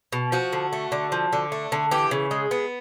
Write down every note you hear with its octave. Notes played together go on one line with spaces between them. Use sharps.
B2
F3 F#4
D3
A3
D3
F3
D3
A3
D3
E3 G4
C#3
G#3
B3